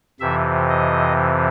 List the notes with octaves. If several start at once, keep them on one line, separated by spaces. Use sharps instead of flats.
F2 C3 E3 E5
D#5